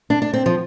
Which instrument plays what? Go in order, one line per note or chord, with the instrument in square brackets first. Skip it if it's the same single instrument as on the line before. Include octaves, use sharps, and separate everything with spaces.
[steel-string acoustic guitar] D4
D4
C4
F3